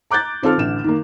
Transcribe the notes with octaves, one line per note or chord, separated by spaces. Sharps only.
A#5 D6 F#6 G6 A6
D#3 C4 F4 A4 F6
A1 D3 E7
D#3 A#3